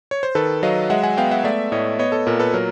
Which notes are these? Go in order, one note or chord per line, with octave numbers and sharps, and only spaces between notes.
C#5
C5
D#3 A4 B4
F#3 D#5 F5
G#3 E5 F#5
F#5 G#5
B3 F5 G5
E5 F#5
A3 D5 E5
A2 C#5 D#5
B3 C#5 D#5
A4
A#2 A#4
A4 B4
F#3 A#4